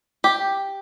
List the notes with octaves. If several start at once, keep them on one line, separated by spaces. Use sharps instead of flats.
G4